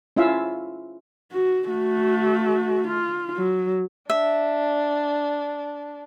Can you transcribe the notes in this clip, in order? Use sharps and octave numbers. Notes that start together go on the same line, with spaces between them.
C#4 E4 F4 E5 F5
F#4
A3 F#4
F4
F#3
D4 E5